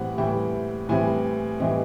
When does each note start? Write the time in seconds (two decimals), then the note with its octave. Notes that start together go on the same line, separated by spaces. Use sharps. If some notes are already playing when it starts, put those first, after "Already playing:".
Already playing: A2 E3 G3 C4 F#5
0.18 A2 E3 G3 C4 G5
0.89 A2 E3 G3 C4 G#5
1.60 A2 E3 G3 C4 D#5